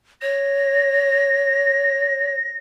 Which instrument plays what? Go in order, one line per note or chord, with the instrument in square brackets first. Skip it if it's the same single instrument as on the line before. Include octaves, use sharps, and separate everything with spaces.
[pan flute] C#5 [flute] A#6